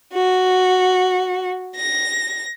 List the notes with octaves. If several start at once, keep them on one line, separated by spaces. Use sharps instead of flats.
F#4
A#6